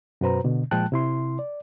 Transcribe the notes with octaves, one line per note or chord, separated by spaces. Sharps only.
F#2 B2 F#4 B4 C5 A#5
B2 D3
A#2 F3 G#3 G5 A5 F#6
C3 E4 C6
D5